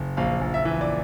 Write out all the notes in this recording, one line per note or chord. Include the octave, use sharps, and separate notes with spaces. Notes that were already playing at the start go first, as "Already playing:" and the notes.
Already playing: F#1
A#1 F5
A#1
E5
E3
D5